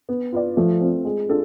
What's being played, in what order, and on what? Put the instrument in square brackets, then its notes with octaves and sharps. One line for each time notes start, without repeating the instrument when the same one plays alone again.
[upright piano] B3
F4 B4 D5
[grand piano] F3 [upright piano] A3
[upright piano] C4 F4
G#3
D4 F4 A4